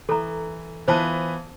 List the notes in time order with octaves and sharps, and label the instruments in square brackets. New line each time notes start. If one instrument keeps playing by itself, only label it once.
[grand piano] E3 [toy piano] A4 A#5
[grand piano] E3 B3 F4 [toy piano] C5 A5